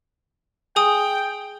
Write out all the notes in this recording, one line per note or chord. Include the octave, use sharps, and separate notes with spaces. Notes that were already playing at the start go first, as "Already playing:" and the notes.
G#4 G5 G#5 D#6